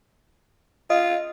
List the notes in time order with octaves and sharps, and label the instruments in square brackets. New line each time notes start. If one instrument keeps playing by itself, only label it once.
[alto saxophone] F4 [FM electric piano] D#5